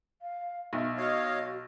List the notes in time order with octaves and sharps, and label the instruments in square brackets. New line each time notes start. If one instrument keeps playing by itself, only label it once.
[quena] F5
[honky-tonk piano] B1 [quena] E5
[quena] F#4 [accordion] C#5 D#5 F5